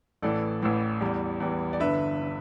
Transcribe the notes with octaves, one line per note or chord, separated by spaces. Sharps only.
A1 A2 E3 A4 D5
A1 A2 E3
E2 E3 G3
E2 E3 G3
D5
G1 G2 D3 B4 E5
D3